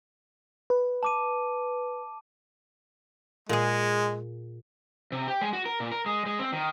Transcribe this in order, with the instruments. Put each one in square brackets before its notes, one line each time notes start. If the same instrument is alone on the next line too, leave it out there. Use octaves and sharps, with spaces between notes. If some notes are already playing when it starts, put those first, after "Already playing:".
[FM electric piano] B4
[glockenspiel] A5 D6 D#7
[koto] A#2 G#4 [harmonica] G#3
[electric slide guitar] C3
G4
G#3
F#4
A#4
A#2
A#4
G#3
G#3
C4
D#3